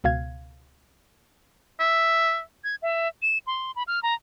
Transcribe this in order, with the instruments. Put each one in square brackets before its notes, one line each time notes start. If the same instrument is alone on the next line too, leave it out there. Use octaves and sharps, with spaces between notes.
[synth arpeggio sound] C#2 B2 F5 G#6
[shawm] E5
[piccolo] G#6
E5
E7
C6
B5
F6
A#5